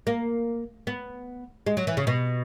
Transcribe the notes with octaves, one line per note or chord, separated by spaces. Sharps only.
A#3
B3
G#3
F#3
E3
C#3
B2